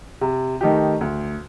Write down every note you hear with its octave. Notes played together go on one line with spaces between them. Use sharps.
C3
D#3 A3 D#4 G4
D2